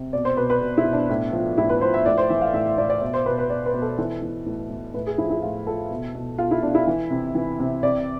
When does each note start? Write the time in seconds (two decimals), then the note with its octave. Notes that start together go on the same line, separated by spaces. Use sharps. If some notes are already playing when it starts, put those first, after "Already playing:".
Already playing: C3
0.13 B2 D5
0.25 C5
0.37 B2 B4
0.50 B4
0.61 B2
0.78 E4
0.85 B2
0.93 D4
1.09 A2
1.33 F3
1.57 A2 E4
1.69 B4
1.81 F3 C5
1.94 E5
2.05 A2 D5
2.18 C5
2.30 E3 E5
2.41 F5
2.54 A2 E5
2.66 E5
2.78 A2 D5
2.90 D5
3.01 B2 D5
3.14 C5
3.26 B2 B4
3.38 B4
3.50 B2 D5
3.66 B4
3.74 B2
3.82 A4
3.98 E3 A4
4.22 E3
4.46 A2
4.70 A2
4.94 A2 B4
5.07 G#4
5.18 F3 E4
5.30 E4
5.42 A2 F4
5.67 F3 A4
5.91 B2
6.15 B2
6.38 B2 F4
6.51 E4
6.62 B2 D4
6.75 E4
6.87 E3
7.10 C3
7.35 E3
7.59 C3
7.83 C3 D5